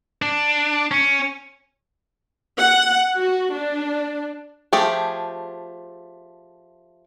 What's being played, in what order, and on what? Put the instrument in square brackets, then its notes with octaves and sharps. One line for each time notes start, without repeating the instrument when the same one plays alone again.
[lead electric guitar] D4
C#4
[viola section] F#5
F#4
D4
[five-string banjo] F3 A3 G4 G#4